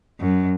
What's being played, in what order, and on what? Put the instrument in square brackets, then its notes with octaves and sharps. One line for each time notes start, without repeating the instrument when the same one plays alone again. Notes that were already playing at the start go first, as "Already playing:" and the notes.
[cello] F#2